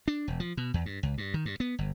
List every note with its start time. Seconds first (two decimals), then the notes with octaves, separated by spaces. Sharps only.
0.08 D4
0.28 E1
0.40 F3
0.57 B2
0.74 E2
0.86 G2
1.03 C#2
1.18 G2
1.34 D#3
1.45 G2
1.60 B3
1.79 G1